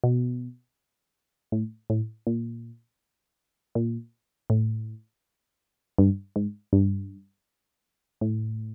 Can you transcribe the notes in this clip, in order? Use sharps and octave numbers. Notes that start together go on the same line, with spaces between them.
B2
A2
A2
A#2
A#2
A2
G2
G#2
G2
A2